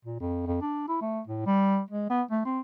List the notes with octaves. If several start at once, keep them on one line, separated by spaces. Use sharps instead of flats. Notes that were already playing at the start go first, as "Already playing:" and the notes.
A#2
F2
F2
D4
E4
A3
A2
G3
G#3
B3
A3
C4